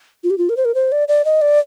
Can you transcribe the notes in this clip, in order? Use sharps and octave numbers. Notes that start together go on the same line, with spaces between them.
F4
G4
F4
A#4
C5
A#4
C5
D5
D5
D#5
D5